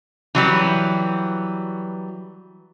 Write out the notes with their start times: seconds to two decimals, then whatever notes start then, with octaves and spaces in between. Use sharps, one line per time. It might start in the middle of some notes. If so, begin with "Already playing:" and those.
0.35 E3 F#3 G3